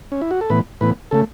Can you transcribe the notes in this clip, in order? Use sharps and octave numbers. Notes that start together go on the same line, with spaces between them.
C#4
E4
F#4
A4
A2 E3 B3 B4
A2 E3 B3 B4
C#3 A3 A4